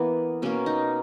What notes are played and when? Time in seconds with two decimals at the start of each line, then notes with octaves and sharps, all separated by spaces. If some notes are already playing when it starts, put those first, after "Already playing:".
Already playing: E3 A#3 B3
0.42 B2 A#3 C#4
0.66 D#4